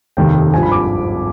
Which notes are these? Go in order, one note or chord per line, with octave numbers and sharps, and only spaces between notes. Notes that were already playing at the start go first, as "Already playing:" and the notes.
F1 D#2 D#3 G5
G#1 G2 F3 G#5
B5
D6